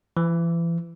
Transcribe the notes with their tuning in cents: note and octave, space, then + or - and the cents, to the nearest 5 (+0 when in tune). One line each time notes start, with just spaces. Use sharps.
E3 +35